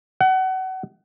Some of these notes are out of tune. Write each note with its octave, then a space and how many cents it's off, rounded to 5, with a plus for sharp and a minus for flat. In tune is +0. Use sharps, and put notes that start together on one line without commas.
F#5 +30